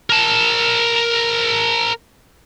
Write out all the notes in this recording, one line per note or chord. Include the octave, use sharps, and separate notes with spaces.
A#4 A5